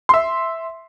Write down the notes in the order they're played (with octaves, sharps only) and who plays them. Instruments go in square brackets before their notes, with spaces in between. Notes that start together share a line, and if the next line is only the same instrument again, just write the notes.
[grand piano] E5 C6